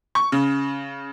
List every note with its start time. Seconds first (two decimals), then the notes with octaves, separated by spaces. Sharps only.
0.15 C#6
0.32 C#3